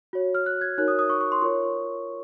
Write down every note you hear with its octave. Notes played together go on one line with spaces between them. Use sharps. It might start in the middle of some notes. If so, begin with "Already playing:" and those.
F#4 C#5
F6
F#6
G#6
D#4 F#4 A#4 C#5 F#6
D#6
D#6
C#6
C#6
C6
F4 A#4 C#5 C#6